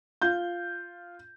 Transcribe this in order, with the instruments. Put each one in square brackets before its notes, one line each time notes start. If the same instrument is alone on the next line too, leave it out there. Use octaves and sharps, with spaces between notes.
[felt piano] F4 G6